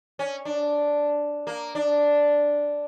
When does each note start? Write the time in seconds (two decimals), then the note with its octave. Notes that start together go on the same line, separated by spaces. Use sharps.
0.19 C#4
0.45 D4
1.47 A#3
1.75 D4